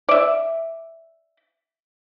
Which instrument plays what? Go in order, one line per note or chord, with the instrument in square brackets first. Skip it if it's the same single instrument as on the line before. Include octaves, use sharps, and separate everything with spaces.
[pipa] D5 E5